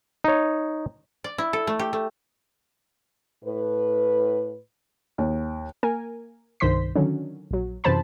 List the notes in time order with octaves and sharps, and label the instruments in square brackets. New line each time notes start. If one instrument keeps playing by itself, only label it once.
[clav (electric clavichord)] D#4 C#5
[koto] D5
E4
A4
A3
G4
A3
[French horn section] A2 B4
[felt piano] D#2
[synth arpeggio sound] A#3 A#4 G#5
C2 G2 D#3 C5 C6 B6
D3 D#3 F#3 C#4
A#1 F#3
F#2 C3 E3 C5 A5 B5